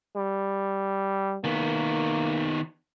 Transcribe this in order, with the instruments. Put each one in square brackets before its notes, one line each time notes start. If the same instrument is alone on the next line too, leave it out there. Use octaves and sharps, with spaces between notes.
[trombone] G3
[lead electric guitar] D#3 B3 [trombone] A#3